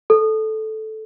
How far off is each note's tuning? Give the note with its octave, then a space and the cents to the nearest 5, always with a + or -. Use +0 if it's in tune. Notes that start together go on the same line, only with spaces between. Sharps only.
A4 -10